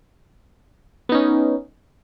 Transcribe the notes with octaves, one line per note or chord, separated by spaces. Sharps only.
B3 C#4 D#4